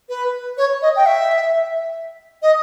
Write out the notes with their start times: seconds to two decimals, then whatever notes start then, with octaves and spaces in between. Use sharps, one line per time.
0.09 B4
0.57 C#5
0.82 D#5
0.96 G5
1.06 E5
2.42 D#5